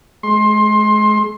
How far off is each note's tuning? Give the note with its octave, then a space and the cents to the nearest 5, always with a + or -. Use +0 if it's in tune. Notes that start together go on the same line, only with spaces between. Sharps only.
G#3 +30 C6 +20